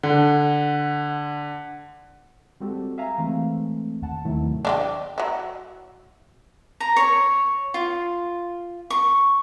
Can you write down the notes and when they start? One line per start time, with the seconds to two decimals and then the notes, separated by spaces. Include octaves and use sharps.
0.03 D3 F#5
2.60 G3 G#3 C4 F#4 G4 A4
2.98 E5 F5 G#5 A#5
3.18 E3 G#3 A3 C4
4.02 D#2 F#5 A5
4.25 G#2 C3 D#3 F#3 A3 E4
4.65 D4 F4 G4
5.18 F#3 E4
6.80 A#5
6.96 C#5
7.74 F4
8.90 C#6